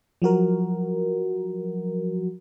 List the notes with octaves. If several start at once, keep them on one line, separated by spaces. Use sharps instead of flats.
F3 F#3 F#4 A#4